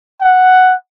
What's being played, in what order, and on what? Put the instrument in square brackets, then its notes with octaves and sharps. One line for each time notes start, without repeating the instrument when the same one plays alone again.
[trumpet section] F#5